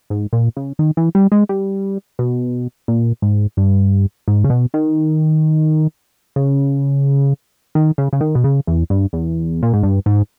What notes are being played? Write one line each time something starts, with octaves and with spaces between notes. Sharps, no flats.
G#2
A#2
C#3
D#3
E3
G3
G#3
G3
B2
A#2
G#2
G2
G#2
C#3
B2
D#3
C#3
D#3
C#3
C#3
D#3
B2
C#3
E2
G2
E2
A#2
G#2
G2
G#2